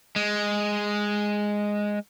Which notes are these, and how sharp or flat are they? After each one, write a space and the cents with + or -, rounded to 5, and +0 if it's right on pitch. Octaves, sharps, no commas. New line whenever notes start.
G#3 -5